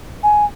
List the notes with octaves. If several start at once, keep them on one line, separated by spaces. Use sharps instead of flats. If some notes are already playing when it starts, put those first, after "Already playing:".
G#5